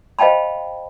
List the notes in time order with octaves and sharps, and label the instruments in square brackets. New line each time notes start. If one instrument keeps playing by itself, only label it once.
[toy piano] C5 D#5 F5 G5 A5 B5